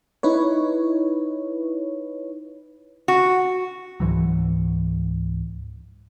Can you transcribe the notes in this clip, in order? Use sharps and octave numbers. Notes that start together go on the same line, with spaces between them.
D#4 E4 B4 C#5
F#4
C#2 G#2 E3 F#3